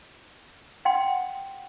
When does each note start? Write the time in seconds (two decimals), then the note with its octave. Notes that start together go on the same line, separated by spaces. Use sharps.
0.85 F#5 G5 C6